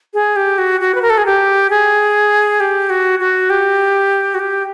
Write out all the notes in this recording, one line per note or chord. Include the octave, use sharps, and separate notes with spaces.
G#4
G4
F#4
F#4
B4
A#4
A4
G#4
G4
G#4
G4
F#4
F#4
G4
F#4
G4